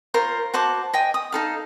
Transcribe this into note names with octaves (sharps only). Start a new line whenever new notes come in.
F4 A#4 C5 C#5
F#4 C5 A5 D6
D#5 G5 G#5
D#6
D#4 A4 F5